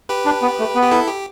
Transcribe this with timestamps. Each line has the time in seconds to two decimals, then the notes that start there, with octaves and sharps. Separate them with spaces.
0.09 G4 B4
0.25 D4
0.42 B3
0.59 A3
0.75 B3
0.82 G4
0.91 E4 A4
1.08 G4